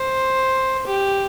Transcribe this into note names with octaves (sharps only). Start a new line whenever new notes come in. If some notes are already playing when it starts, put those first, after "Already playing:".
Already playing: C5
G4